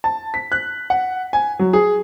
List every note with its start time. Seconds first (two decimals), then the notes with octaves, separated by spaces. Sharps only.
0.04 A5
0.34 B6
0.52 F#6
0.90 F#5
1.33 G#5
1.59 F#3
1.73 G#4